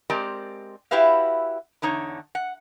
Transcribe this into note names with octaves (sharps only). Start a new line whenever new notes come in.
G#3 C4 G4 A#4 D5
E4 F#4 G4 B4 E5 F5
E2 D3 D#4 C#5
F#5